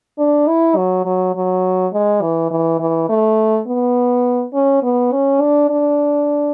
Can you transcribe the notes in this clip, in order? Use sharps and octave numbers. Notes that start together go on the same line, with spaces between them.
D4
E4
F#3
F#3
F#3
G#3
E3
E3
E3
A3
B3
C#4
B3
C#4
D4
D4